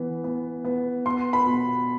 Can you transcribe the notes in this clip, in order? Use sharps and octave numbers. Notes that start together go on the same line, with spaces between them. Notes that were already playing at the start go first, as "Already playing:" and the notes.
Already playing: E3 B3
B3
B3
B3 C6
B5
B2